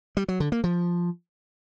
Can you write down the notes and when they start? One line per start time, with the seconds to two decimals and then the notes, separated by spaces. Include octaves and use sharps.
0.17 G3
0.28 F#3
0.40 D3
0.52 A#3
0.64 F3